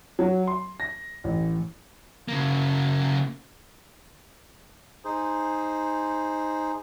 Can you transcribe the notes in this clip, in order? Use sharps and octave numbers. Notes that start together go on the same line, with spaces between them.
F#3
C6
A#6
A1
C#3 A#3
D#4 G#4 C5